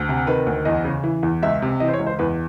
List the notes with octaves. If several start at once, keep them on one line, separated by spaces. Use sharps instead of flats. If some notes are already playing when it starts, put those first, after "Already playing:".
Already playing: D2
C3
D#3 B4
D2
E2 D#5
C#3
E3
E2
C#2 E5
C3
E3 D#5
C5
C#5
C#2
C5
E2 B4